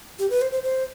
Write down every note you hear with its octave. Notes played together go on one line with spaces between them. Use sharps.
G4
B4
C5
C5
C5